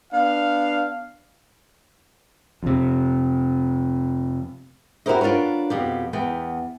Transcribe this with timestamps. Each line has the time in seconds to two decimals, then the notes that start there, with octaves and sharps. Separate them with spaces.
0.12 B3 D4 F5
2.63 F2 C3
5.06 E4 F#4 G4 A#4 C5 D#5
5.21 D4 F4 A#4 B4 C#5
5.70 F2 B2 G4
6.13 E2 B3 G5